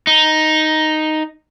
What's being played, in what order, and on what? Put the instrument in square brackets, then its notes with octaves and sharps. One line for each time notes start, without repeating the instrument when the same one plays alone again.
[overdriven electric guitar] D#4